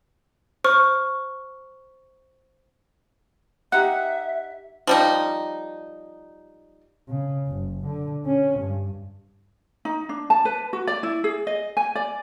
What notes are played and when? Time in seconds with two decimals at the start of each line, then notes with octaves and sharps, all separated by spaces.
0.64 C5 C#6 F6
3.72 D#4 G4 E5 F#5 F#6
4.87 F3 G3 D#4
7.08 C#3
7.48 F#1
7.85 D3
8.26 C#4
8.58 G2
9.85 D#4
10.09 D4
10.30 A5
10.45 B4
10.73 F#4
10.87 D5
11.03 E4
11.24 G#4
11.47 D#5
11.77 G#5
11.95 D5